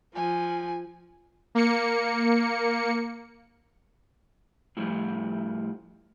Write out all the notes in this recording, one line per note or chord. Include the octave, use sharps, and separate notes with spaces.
F3 G#5
A#3 C#7
A2 F3 G3